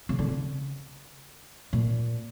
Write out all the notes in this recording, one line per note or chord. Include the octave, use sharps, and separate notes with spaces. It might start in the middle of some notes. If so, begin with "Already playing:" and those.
C#3
D3
C#3
A#2